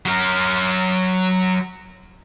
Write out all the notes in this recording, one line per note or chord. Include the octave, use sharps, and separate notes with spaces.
F#3 A#4